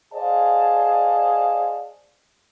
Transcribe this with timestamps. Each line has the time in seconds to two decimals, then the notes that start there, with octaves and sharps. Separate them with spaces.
0.14 G#4 C5 D5 D#5 F5 A5